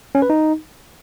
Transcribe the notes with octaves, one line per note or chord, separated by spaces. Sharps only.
C#4
B4
D#4